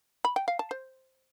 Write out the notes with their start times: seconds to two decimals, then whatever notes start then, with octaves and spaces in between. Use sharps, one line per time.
0.25 B5
0.36 G5
0.48 F5
0.59 A5
0.71 C5